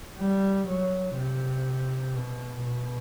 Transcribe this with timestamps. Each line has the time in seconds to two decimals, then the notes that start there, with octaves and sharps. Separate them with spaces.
0.18 G3
0.68 F#3
1.17 C3
2.16 B2
2.64 B2